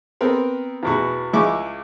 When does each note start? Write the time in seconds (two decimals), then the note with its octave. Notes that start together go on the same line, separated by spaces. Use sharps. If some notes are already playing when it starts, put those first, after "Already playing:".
0.21 B3 C4 A#4
0.83 E2 B2 F#4
1.33 C#2 G#3 E4 C#6 D6